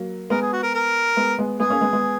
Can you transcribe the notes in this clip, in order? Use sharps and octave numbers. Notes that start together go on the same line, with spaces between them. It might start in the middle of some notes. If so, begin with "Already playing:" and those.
Already playing: F#3 A#3
G#3 B3 A#4
G#4
F#4
A#4
A#4
G#3 B3
G#3 B3
G#3 B3 G#4
A#3 C#4
G#3 B3
G#3 B3